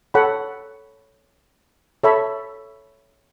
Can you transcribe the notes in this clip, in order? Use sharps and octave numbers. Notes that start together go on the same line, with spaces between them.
A4 C#5 F#5 B5
A4 C#5 E5 B5